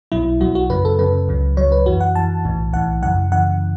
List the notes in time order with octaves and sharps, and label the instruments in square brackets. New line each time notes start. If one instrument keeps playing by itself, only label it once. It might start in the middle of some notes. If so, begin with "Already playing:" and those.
[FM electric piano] B1 B2 F#3 E4
B1 B2 F#3 F#4
F#4
F#2 C#3 F#3 B4
A4
F#2 C#3 F#3 B4
C#2 C#3 F#3
C#2 C#3 F#3 C#5
B4
F#2 E3 F#4
F#5
F#2 E3 A5
B1 A2 E3
B1 A2 E3 F#5
F#2 C#3 E3 F#5
F#2 C#3 E3 F#5